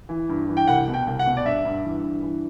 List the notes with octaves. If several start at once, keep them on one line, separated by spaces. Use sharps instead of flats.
E3
G2
E3
G5
C2 F#5
B2
G5
C2
F#5
B2
D5
G2 E5
G2
E3
G2
E3